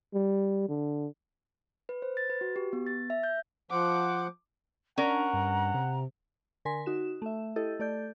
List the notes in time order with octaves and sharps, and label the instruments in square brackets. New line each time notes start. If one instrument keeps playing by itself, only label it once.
[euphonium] G3
D3
[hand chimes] B4
C5
A6
B4
F#4
G4
B3
A6
E5
G6
[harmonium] F3 C5 F#5 [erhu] D6
[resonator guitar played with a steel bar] C#4 A#4 [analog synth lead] D4 [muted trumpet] F#5 [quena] A#5
[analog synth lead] G2
C3
[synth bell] D3 A#4 G#5 C6 B6
D#4 F#4 E7
A3 E5
E4 G4 A4 D#5
A3 A4 D5 G6